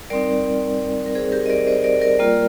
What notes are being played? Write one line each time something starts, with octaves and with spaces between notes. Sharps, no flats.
G3 C4 D#4 A#4 D5
A#4
G#4 C5
G4 A#4
D#5
A#4 D5
C5 D#5
A#4 D5
A#4 D5
G3 A#3 F4